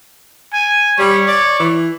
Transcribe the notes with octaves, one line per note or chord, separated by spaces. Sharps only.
G#5
G3 C#5
D5
E3